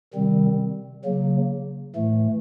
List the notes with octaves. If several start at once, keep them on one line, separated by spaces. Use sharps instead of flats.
C3 D#3 G3 C4
C#3 F#3 A#3
A2 E3 A3